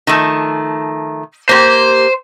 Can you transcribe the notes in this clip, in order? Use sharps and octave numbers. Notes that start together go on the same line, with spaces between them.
D#3 F3 A3
A#3 G4 C5 C6